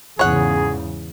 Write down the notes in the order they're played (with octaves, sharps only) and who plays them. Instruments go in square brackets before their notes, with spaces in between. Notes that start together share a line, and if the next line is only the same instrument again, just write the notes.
[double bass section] E2 G#2 C#3 [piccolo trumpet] G#4 [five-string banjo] C#5 F#5